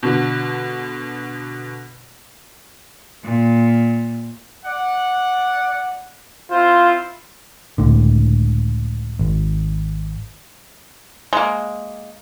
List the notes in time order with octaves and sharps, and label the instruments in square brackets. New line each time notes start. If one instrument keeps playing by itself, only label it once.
[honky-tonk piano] B2 D3
[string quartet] A#2
[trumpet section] D5 F#5
[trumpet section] C4 E4 C5 [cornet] F4
[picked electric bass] C#2 A2 D3
G#1
[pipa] G#3 A#3